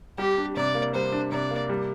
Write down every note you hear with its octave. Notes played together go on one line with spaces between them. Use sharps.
G3 G4
D4
C3 D5
A#3
G3 C5
D4
C3 D5
A#3
G3